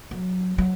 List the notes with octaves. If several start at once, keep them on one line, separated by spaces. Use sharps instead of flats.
F#3
F#3